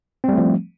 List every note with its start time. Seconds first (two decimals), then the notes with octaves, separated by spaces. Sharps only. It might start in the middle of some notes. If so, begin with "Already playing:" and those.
0.24 C4
0.28 G3
0.33 A3
0.38 F3